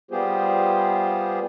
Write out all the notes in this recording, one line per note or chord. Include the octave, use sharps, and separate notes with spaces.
G3 B3 F4 G4 G#4 C5